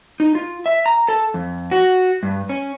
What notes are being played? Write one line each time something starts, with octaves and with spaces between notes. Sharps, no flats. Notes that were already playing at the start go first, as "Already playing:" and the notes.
D#4
F4
E5
A#5
A4
F2
F#4
G2
C#4